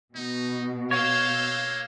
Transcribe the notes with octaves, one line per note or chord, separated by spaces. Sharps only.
B2 D#4
A#3 C#5 F5 E6 G6